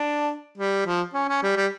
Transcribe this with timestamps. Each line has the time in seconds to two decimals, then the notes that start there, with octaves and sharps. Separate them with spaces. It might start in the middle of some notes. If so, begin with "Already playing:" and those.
Already playing: D4
0.58 G3
0.86 F3
1.14 C#4
1.28 C#4
1.43 G3
1.56 G3